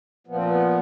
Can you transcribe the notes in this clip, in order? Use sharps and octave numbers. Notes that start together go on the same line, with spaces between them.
A#2 F3 B3
C4
B3